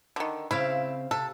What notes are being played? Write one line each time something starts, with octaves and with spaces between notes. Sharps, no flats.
D3 D#3
C#3 C4 E4 F5
C3 A4